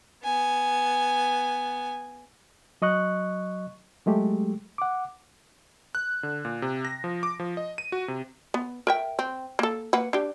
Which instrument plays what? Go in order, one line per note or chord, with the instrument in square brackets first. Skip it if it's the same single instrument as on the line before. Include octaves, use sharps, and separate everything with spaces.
[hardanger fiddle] B3 G#5
[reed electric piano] F#3 D#5 C#6 F#6
F#3 G#3 A3 G4
F#5 D6
[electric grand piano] F#6
D3
A#2
C3
A#6
F3
D6
F3
D#5
D#7
F#4
C3
[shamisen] B3
A#4 E5 G5
C4
A#3 A4
A#3 B4 F#5
D4 G4